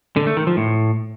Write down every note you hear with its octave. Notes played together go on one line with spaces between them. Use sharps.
D3
A3
D#3
F3
A2